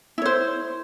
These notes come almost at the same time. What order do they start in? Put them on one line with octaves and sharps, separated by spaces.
E4 C#5 C5